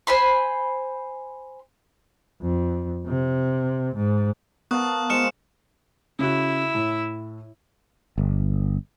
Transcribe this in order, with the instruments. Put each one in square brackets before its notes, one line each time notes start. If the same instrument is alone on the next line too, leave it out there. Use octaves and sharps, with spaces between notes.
[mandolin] C5 G#5 B5 C6
[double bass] F2
C3
G#2
[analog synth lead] B3 [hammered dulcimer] A#4 F5 A5 [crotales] C#6 D#6 F#6
[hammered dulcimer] G#3 F4 C5 [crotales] F6 C#7 E7
[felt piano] C#3 F#4 [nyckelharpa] E4 E5
[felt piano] A2
[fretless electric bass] G1